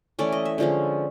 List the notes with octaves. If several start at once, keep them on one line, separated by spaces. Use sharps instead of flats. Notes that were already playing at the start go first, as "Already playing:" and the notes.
E3 A3 C#4 E4 D5
D#5
E5
D3 F3 G#3 C#4